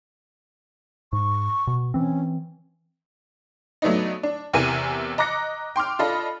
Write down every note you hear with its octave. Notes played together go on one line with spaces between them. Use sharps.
G#2 C#6
B2
E3 C4 C#4
F#3 A3 B3 D4 D#4
D4
E2 C3 E3 A#4 G#5 D#7
D#5 A#5 D6 F#6 A#6 C#7
G5 C6 D6 F6
D4 F4 A4 D#5 B5